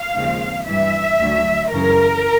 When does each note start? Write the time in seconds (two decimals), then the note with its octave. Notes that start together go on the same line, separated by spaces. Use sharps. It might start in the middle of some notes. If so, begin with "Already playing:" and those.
Already playing: F5
0.16 D#2 C#3 F3 G#3 C4
0.68 G2 E3 G3 E5
1.20 D2 D3 F#3
1.72 F#2 C#3 E3 A#4